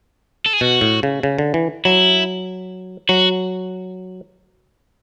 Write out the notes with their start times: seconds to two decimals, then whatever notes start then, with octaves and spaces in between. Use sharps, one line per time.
0.46 A4
0.53 G#4
0.61 B2 F#4
0.81 A2
1.03 C#3
1.23 C#3
1.38 D3
1.54 E3
1.85 F#3 E4
3.09 F#3 F#4